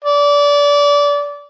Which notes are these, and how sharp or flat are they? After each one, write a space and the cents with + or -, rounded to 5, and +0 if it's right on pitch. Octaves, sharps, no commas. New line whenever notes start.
D5 -25